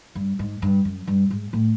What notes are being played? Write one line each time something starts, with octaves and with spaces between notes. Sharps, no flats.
G2
G#2
G2
F#2
G2
G#2
A2